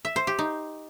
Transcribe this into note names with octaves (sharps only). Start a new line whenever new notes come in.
E5
C5
G4
D#4